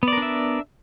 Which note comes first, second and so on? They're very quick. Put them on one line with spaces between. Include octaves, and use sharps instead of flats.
B3 D5 A#4 D4 E5